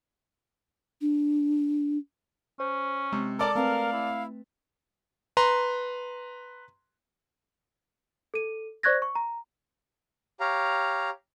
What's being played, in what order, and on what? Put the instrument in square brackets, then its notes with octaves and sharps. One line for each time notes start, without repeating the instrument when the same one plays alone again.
[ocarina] D4
[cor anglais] C#4 [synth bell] C5
[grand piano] C3 [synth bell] G#3
[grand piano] A4 D5 A5 [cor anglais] A#4 [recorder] D6
[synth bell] A3 C4 B4 [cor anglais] A#4 [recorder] F5
[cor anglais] E4
[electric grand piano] B4 A#5 C6
[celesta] A4 D#7
C5 D5 C#6 F#6 G#6 A#6
C#6
A#5
[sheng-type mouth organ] G4 C#5 F5 A#5